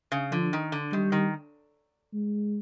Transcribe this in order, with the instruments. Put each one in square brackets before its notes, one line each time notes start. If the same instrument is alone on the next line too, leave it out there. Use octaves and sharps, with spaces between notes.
[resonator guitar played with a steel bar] C#3
[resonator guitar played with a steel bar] D3 [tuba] F3
[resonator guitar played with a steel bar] D#3
D3
[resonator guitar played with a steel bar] D#3 [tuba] G3
[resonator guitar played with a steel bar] D#3
[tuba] G#3